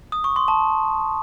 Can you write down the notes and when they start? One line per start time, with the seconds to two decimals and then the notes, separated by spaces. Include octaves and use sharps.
0.12 D#6
0.24 C#6
0.36 C6
0.48 A5